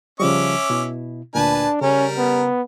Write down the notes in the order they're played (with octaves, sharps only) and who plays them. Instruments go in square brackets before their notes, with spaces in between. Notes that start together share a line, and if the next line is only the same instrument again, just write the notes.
[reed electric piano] C#3 F3 G3 [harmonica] C#4 E5 D6
[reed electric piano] B2 E4
[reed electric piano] D2 A#2 [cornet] D4 [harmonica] B4 G#5 A5
[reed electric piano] C#3 [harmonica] G3 A#4 [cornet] C#4
[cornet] B3